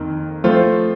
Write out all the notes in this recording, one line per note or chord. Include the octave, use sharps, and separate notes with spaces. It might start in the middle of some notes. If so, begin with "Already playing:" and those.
Already playing: F2 D#3 A#3
F3 A3 C4 F4 C5